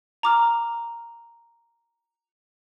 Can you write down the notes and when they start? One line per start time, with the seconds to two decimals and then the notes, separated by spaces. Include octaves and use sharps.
0.23 A#5 D6 F6